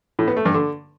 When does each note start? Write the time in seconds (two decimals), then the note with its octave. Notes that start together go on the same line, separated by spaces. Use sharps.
0.19 A2
0.28 B3
0.37 A3
0.45 G2
0.54 D3